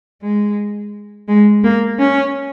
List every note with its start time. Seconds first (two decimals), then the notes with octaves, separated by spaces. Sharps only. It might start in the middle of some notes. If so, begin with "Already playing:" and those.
0.22 G#3
1.28 G#3
1.64 A#3
1.99 C#4